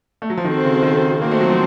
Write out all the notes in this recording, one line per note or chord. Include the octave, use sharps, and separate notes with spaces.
A3
F#3
F3
D#3 C4 F#4 A4 C5
C#3
D#3
A#3 C4 F#4 C5
A3
F#3
F3